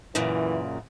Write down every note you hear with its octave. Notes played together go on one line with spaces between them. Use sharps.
F#2 A#2 C#3 E3